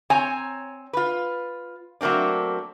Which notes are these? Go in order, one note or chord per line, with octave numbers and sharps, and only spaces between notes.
C4 C#5 G#5 A#5
F4 B4
F#3 A3 A#3 C4 D4